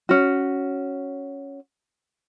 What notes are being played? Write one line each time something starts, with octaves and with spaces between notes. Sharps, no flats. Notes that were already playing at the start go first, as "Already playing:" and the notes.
C#4 F#4